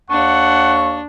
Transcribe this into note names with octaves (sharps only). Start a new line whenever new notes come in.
D#2 D4 F#5 C#6